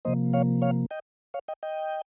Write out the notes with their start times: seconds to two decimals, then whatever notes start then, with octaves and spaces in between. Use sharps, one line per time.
0.05 C3 F3 A#3 C5 D#5
0.33 C#5 F5
0.62 C#5 F5
0.91 D#5 G5
1.34 C#5 F5
1.48 D#5 G5
1.63 D#5 G5